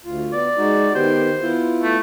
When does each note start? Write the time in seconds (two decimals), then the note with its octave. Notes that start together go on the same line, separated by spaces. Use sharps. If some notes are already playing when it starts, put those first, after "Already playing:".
0.05 D2 F4
0.33 B3 D5
0.57 G#3 D#4 F#4
0.95 D#3 B3 G4 C5
1.41 B3 E4 F4
1.83 A3